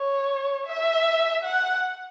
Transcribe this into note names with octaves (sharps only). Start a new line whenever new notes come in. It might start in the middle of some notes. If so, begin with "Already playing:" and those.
Already playing: C#5
E5
F#5